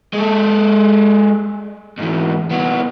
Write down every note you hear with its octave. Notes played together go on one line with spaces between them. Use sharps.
G#3 A4
G#2 E3
C2 B3